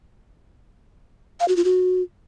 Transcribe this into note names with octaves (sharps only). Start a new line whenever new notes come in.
F5
F#4
F4
F#4